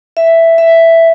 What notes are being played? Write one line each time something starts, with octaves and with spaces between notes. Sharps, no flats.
E5
E5